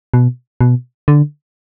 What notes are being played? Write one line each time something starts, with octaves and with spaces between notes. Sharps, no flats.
B2
B2
D3